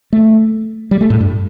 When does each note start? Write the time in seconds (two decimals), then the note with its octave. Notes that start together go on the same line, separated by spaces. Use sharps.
0.13 A3
0.91 G3
1.01 A3
1.10 A2
1.20 G2